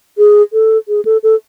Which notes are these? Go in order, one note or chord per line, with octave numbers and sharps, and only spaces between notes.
G#4
A4
G#4
A4
A4